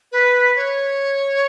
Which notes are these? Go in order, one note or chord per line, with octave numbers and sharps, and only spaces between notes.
B4
C#5